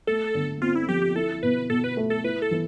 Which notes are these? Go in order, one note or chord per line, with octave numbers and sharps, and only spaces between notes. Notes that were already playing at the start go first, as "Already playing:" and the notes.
A3 A4
D3
C4 F4
E4
F3 G4
G4
E4 A4
B2 B4
B2 A4
B4
A3
A4
E4 B4
A4
E3